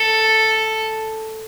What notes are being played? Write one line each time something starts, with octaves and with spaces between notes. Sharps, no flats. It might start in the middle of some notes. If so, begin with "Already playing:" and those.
Already playing: A4